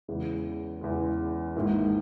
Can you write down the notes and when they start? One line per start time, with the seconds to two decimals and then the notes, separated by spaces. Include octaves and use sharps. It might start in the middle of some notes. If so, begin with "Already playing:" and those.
0.08 E2 C#3 E3 G#3
0.81 E2 C#3 E3 G#3
1.56 G#1 G#2 D#3 A#3 E4